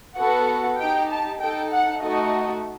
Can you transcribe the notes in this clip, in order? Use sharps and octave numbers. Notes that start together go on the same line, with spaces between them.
B3 F#4 A4 F#5
D#4 G4 G5
A5
D#4 A4 G5
F#5
A3 D#4 F#4 A4 D#5